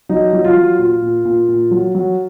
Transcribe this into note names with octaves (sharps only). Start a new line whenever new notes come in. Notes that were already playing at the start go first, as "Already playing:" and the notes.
F#3 D#4
F#3
F4
F#3
A#2 F4
A#2
A#2
A#2
F#3
F#3